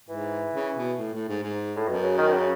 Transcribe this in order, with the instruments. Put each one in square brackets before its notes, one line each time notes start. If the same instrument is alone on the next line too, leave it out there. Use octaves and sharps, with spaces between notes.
[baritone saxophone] G#2 [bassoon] E3
[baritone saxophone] C#3
B2
A2
A2
G#2
G#2
[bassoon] A2
[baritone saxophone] F#2 [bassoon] B2
[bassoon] C#3
D#3
D#3
C#3